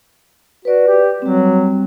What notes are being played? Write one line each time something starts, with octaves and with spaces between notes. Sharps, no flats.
F#4 B4 D5
G4
F#3 G3 C4